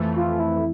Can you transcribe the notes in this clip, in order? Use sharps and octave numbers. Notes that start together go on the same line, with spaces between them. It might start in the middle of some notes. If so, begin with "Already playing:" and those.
Already playing: F2 E3 A3
F4
E4